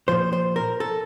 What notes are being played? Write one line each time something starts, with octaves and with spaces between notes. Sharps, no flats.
A#2 F3 C5
C5
A#4
A4